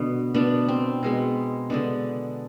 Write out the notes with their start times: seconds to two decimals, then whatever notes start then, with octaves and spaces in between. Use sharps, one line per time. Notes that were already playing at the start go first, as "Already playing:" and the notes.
Already playing: B2 D3 B3
0.34 B2 B3 D4
0.68 C4
1.03 B2 G#3 B3
1.70 D3 G#3 B3 D4